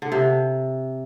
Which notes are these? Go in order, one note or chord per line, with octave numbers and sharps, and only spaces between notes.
D3
C3